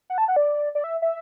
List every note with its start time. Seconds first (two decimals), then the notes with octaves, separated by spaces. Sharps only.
0.10 F#5
0.18 A5
0.28 F#5
0.36 D5
0.75 D5
0.84 E5
1.02 E5